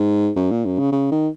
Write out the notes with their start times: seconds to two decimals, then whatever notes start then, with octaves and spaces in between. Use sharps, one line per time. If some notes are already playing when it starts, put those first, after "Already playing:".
Already playing: G#2
0.36 F#2
0.51 A#2
0.65 F#2
0.79 C#3
0.92 C#3
1.11 D#3